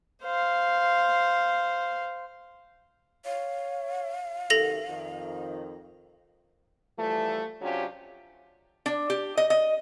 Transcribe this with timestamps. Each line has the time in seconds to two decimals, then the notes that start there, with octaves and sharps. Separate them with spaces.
0.23 C5 F5
3.25 C#5 F5
4.50 F#2 C3 D#3 A4 A#6 F7
4.89 F2 D#3
6.98 E3 F3 G3 A3
7.61 C3 F#3 C#4 D4 F4 G4
8.86 D4
9.10 G4
9.37 D#5
9.50 D#5